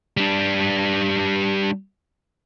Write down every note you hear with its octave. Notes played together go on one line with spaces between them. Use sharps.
G3 D4